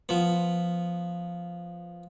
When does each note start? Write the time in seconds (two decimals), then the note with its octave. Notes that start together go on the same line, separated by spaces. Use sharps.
0.09 F3 B3